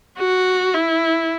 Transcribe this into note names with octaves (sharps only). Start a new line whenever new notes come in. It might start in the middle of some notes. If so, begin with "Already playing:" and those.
F#4
E4